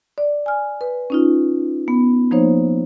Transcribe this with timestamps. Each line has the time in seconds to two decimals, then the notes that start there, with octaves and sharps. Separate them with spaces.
0.18 D5
0.46 G#5 F6
0.81 B4
1.10 C#4 D#4 F4
1.88 B3
2.31 F3 A#3 D#4 C5 C#5